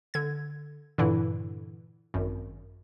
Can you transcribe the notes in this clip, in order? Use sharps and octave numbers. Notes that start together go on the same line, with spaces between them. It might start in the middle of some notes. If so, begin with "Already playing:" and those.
D3 G#6
G2 A#2 D3 E3 E4
G#1 F#2